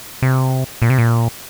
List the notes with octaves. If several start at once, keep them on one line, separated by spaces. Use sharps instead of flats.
C3
A#2
C3
A#2